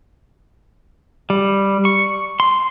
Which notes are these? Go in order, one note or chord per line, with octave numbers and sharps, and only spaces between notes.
G3
C#6
C6